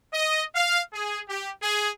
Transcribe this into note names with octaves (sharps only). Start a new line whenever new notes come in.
D#5
F5
G#4
G4
G#4